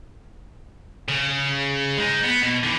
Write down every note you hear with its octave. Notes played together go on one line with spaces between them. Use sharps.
C#3
G#3 D#4
B3
B2
D3 E3